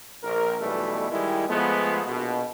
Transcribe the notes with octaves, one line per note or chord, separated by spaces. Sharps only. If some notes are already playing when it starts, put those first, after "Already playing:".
A#1 A#4
B1 B2 E3 G3 A3
D#3 G3 G#3 E4
F3 G#3 A3 B3
A#1 B2